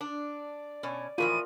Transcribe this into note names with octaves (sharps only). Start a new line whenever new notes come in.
D4 D5
B2 C#4
A2 E3 F3 F4 A#4 D#7